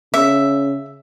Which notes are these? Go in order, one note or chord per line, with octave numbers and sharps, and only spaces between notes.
C#3 E5